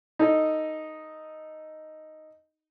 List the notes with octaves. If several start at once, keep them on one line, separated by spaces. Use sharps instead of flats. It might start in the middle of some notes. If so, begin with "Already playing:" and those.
D#4 A4 D#5